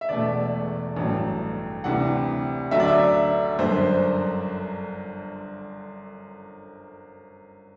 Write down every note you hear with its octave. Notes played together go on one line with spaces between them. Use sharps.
E5
E1 E2 B2 A3 D5
A1 G2 F#3 A3
D2 C3 E3 G3 F#5
D2 D3 F#3 E5
D5
E5
G1 F#2 D3 C5